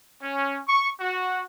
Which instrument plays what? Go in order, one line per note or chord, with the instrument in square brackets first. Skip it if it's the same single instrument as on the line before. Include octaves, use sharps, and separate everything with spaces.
[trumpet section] C#4
C#6
F#4